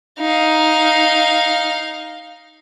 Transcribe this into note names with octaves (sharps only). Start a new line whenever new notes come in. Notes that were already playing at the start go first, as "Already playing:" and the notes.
D#4 F5